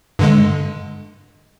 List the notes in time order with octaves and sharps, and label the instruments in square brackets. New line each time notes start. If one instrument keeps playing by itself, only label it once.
[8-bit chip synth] G2 D3 G#3